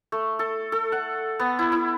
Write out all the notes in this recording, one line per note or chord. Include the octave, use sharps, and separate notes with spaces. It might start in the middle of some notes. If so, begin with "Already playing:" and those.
A3
A4
A4
F#5
B3
E4
E4